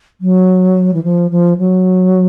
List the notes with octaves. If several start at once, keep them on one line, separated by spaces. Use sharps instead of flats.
F#3
E3
F3
F3
F#3